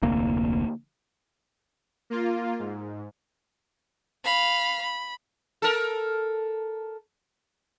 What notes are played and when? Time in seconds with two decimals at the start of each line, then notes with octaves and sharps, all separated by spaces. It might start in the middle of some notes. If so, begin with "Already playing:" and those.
0.02 F1 D2 A#3
2.10 A#3 F4
2.59 G#2
4.25 F5 B5
4.82 B5
5.62 A4 A#4